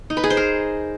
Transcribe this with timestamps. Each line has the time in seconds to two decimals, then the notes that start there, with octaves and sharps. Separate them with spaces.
0.10 D#4
0.17 B4
0.24 G#4
0.30 C5
0.37 A#4